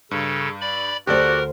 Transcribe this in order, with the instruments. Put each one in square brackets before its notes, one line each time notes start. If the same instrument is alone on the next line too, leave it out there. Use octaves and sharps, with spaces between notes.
[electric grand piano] G2 [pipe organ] C#3 A4
[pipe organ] D5 B5
[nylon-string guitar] D2 C5 [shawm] F#4 [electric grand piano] G4 A4 D5 [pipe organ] A#4